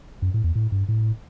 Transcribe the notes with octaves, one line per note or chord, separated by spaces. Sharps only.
F#2
A2
E2
A2
G2
A2